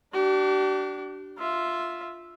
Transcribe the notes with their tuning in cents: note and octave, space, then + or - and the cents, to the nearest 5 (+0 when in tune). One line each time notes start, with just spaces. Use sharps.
D4 +0 G4 -40
F4 +0 E5 +0